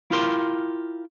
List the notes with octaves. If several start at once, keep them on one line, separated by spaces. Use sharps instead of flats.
E4 F4 G4 A#4 C6